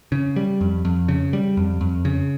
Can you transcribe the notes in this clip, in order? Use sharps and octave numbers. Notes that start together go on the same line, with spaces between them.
C#3
G3
F2
F2
C#3
G3
F2
F2
C#3